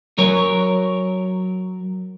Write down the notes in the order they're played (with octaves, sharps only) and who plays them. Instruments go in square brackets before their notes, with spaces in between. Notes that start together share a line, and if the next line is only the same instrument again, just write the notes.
[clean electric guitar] F#3 A#4 C#5